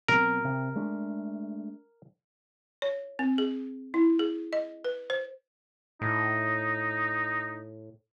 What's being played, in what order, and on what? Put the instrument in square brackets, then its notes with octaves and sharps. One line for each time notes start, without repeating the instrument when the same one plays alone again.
[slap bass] B2 F#3 C4 [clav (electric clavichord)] A#4
[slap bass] C3
G#3 A3 D4
[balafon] C#5
C4
G#4
E4
G#4
D#5
B4
C5
[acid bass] A2 [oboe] D#4